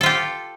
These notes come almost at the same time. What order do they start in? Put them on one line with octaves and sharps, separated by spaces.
A4 F4 G4